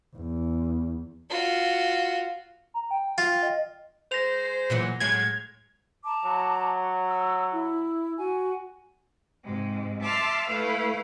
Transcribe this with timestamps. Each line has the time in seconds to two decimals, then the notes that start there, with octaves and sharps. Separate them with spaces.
0.16 E2
1.30 F4 F#4
2.74 A#5
2.91 G5
3.18 F4
3.43 D#5
4.12 G#3 C5 A#6 F7
4.70 A#2 E3 F#3
5.00 A2 F#3 G#3 G#6
6.04 A5 A#5 D6
6.25 F#3
7.07 E6
7.51 E4
8.18 F#4 G#5
9.43 G#2 C3 G#3
10.02 E5 A5 C6 D6 E6 F6
10.48 A3 E4 B4 F5